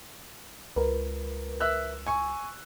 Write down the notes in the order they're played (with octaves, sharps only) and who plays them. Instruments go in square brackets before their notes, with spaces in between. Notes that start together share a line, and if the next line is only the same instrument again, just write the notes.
[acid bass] C#2 [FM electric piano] A#4 B4
[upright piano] E5 E6 F#6
G#5 C#6